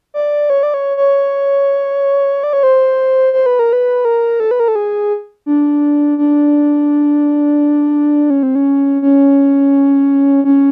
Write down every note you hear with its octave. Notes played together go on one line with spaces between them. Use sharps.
D5
C#5
D5
C#5
C#5
D5
C#5
C5
C5
B4
A#4
B4
A#4
A4
B4
A#4
A4
G#4
D4
D4
C#4
C4
C#4
C#4
C#4